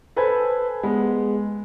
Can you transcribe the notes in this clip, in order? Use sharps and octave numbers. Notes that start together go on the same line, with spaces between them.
A4 B4 C5 G#5 B5 G#6
G#3 B3